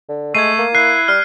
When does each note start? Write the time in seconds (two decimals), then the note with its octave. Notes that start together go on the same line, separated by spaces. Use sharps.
0.09 D3
0.35 G#3 A3 G#6 C7 D#7
0.59 A#3
0.75 E4 F#6 C7
1.08 G3 F6